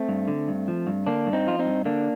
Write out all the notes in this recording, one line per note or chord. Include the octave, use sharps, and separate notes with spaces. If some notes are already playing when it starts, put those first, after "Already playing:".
Already playing: A3 C4
G2
D3
G2
F3
G2
D3 A#3 D4
G2
C4 D#4
F3 F4
C4 D#4
G2
D3 A#3 D4